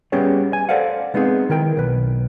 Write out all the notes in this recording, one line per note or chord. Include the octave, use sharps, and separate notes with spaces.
G3 B3 C#4 G4 G#4 C#5
G#5
A4 C5 D5 F5 F#5
G#3 B3 C4 D#4 G#4
D#3 E4 A#4 G5
B1 B4